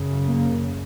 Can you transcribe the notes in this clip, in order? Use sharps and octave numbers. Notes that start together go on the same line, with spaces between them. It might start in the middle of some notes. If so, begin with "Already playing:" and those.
Already playing: F#2 C#3
A#3